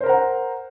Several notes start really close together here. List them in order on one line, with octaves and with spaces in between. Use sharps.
C5 A#4 A#5 F#5